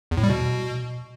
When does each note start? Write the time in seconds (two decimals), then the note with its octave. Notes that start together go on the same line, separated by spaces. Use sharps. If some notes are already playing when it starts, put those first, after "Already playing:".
0.11 E2
0.17 A2
0.23 G3
0.29 B2